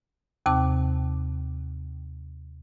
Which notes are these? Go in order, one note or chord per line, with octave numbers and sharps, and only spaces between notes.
D#2 C3 C4 A5 D6